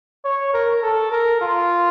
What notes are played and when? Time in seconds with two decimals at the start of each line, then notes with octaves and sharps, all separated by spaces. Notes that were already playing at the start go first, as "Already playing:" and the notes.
0.25 C#5
0.54 A#4
0.83 A4
1.12 A#4
1.41 F4